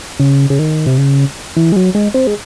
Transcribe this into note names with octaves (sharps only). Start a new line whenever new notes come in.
C#3
C#3
D#3
C3
C#3
E3
G#3
F#3
G#3
C4
G#3